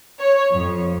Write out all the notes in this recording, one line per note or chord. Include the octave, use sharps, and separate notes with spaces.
C#5
F2